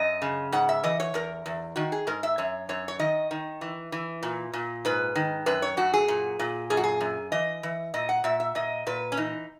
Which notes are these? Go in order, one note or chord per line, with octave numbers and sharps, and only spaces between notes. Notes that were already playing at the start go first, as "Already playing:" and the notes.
Already playing: F#2 D#5
C#3
G#2 F#5
E5
E3 D#5
C#5
E2 A#4
E2
D#3 F#4
G#4
G#2 A#4
E5
F#2 C#5
F#2 C#5
C#5
D#3 D#5
D#3
E3
E3
A#2
A#2
G#2 B4
D#3
F#2 B4
C#5
F#2 F#4
G#4
A#2
A#2
F#2 G#4
F#4
G#4
F#2
E3 D#5
E3
A#2 D#5
F#5
A#2 E5
E5
A#2 D#5
A#2 B4
C#4
E3 D#4